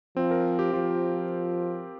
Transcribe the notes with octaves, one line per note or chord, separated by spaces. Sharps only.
F3 C4
A#4
G4
F3 F4